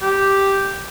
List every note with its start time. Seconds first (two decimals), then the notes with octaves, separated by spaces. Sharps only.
0.02 G4